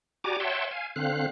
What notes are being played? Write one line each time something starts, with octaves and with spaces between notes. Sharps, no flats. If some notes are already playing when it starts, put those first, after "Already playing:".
F#4 G4 D5 G#5 A#5 D6
C#5 E5 F#5 G5 A5 C6
F5 G#5
D3 C4 F5 F#6